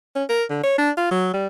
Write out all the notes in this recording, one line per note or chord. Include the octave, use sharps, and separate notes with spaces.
C#4
A#4
D3
C#5
D4
F4
F#3
G3